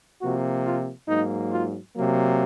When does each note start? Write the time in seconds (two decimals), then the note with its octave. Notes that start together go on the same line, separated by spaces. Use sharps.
0.21 C3 F3 A#3 F#4
0.64 F4
1.08 G#2 F#3 A#3 D#4
1.51 F4
1.94 C3 F#3 A#3